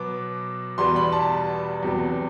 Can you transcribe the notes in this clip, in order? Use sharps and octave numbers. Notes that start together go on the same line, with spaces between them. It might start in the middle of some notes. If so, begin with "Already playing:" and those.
Already playing: B2 F#3 B3 D6
E2 B2 G3 B3 C6
B5
A5
E2 C3 F#3 B3